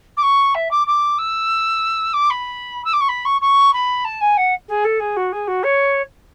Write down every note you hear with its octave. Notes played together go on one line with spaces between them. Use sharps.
D6
C#6
E5
D6
D6
E6
D6
B5
E6
D6
C#6
B5
C#6
C#6
B5
A5
G#5
F#5
G#4
A4
G#4
F#4
G#4
F#4
C#5